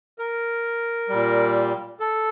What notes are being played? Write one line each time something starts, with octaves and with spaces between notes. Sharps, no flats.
A#4
A#2 G3
A4